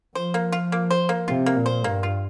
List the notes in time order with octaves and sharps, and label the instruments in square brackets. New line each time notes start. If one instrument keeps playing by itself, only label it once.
[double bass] F3 [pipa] C5
[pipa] A#3
F4
A#3
C5
A#3
[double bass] C3 [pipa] F4
[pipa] A#3
[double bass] A#2
[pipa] C5
[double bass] G2 [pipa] A#3
[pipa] F4